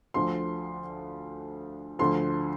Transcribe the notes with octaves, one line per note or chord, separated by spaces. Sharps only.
D2 D3 F3 C6
D2 D3 F3 C6